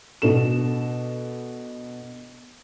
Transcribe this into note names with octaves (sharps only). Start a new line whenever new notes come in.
B2 D4 A4 E7